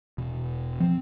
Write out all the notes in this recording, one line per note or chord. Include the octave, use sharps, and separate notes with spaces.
E1 B2
F3 C4